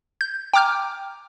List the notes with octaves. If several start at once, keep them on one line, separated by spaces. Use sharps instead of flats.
G6
G5 A#5 D6 F6 G6